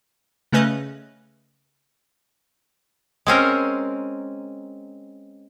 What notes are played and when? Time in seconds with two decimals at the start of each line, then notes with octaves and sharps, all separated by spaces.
0.52 C#3 A3 C#4 B4 D#5
3.27 G#3 C4 C#4 A#4